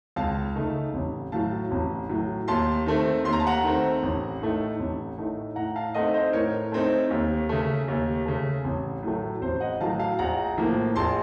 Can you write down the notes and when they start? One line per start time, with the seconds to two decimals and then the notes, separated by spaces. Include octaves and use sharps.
0.16 C#2 F5 A5
0.55 C#3 A3 D#4
0.94 A1
1.32 A2 F#3 F5 A5
1.71 A1
2.09 A2 F#3
2.48 D#2 A5 C6
2.86 D#3 A3 C4
3.24 D#2 C6
3.33 A#5
3.40 A5
3.47 F#5 A#5
3.64 D#3 A3 C4
4.03 A1
4.41 A2 A3 D#4
4.80 A1
5.18 A2 A3 D#4
5.56 A2 F#5 A#5
5.76 F5 A5
5.94 A3 C4 D#4 D#5 F#5
6.14 C5 D#5
6.33 A2 A#4 C#5
6.72 A3 C4 D#4
7.10 D#2
7.49 C#3 A3
7.88 D#2
8.26 C#3 A3
8.64 A1
9.03 A2 F#3 A3
9.42 A1 C5
9.60 D#5 F#5
9.80 A2 F#3 A3 F5 A5
9.99 F5 A5
10.19 A#1 F#5 A#5
10.57 A2 F3 A#3
10.96 A#1 A5 C6